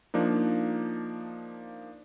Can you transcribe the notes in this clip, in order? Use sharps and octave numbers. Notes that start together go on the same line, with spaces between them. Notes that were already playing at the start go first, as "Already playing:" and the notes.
F3 A#3 D4 D#4